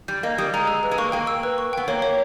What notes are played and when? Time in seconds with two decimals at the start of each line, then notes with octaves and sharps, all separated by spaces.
0.08 G3 G6
0.23 A#3 D#5
0.38 G3 D#6
0.54 G#3 A#5
0.68 E6
0.83 B4
0.91 G#3
0.98 A#3 C#6
1.12 A#3 G5
1.27 E6
1.43 B4
1.58 C#6
1.73 B3 G5
1.88 A#3 C#5
2.02 C#5